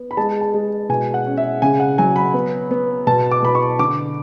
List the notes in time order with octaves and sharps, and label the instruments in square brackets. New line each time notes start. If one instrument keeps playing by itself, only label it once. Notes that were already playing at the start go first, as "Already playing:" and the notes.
Already playing: [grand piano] B3
B5
G#3 A5
A5
G#3
B2 G#5
F#5
C#4
E5
C#3 G#5
F#5
F#3 G#5
B5
B3
B3
B2 A5
D6
B2 B5
C#6
D3 D6